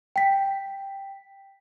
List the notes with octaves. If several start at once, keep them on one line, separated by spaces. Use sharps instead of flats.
G5 B6